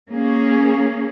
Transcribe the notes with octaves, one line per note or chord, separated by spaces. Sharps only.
A#3 C#4 G#4